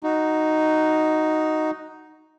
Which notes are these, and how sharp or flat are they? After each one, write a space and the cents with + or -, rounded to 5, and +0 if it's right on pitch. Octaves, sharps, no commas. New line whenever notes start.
D#4 +0 F#4 +0